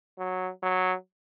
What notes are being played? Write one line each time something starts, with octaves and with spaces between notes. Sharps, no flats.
F#3
F#3